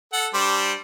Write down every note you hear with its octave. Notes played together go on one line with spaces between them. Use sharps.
A4 F#5
G3 D4 C5